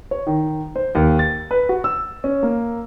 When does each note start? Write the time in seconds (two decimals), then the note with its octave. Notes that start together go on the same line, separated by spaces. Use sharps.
0.11 C#5
0.27 D#3
0.76 C5
0.95 D#2
1.19 A6
1.51 B4
1.69 F#4
1.84 E6
2.24 C#4
2.43 A#3